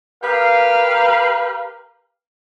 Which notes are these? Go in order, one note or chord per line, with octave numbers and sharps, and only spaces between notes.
G4 A#4 B4 F5